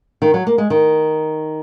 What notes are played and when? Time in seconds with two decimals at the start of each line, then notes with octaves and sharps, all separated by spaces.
0.22 D#3
0.34 F#3
0.47 A#3
0.58 G#3
0.70 D#3